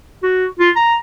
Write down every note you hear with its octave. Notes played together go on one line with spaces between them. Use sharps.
F#4
F4
A#5